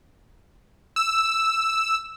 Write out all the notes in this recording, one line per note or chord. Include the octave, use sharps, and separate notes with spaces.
E6